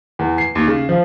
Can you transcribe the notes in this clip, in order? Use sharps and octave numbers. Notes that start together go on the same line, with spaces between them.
E2
C7
D#2
C#3
F3